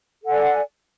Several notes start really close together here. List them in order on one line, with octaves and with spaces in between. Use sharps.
A4 F#5 G#5 D5